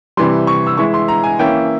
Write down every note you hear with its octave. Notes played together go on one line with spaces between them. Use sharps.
C3 E3 G3 C6
C#6
E6
E3 G#3 E4 C#6
C6
A#5
G#5
E3 A#3 C#4 E4 G5